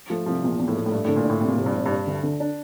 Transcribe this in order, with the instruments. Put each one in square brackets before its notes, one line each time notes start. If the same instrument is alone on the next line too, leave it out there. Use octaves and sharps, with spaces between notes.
[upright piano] F3 [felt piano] A3
[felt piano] C2 [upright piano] F3
[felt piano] E2 [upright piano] A#2
[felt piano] E2
[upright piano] A2
[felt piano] A3
[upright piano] A2
[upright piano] G2 [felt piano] A3
[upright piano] A2
[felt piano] D3
[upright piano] A#2
[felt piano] D4
[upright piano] A2
[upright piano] A2 [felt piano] C3
[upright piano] A#2
[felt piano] F1 [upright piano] A2
[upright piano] G2
[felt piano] F1
[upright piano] G2 [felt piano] D4
[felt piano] D2
D3
D4